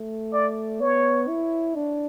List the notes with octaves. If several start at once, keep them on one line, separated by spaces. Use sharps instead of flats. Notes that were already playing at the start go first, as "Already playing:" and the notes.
Already playing: A3
D5
B3 C#5
E4
D4